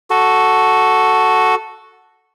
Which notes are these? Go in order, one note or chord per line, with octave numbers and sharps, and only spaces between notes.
F#4 A4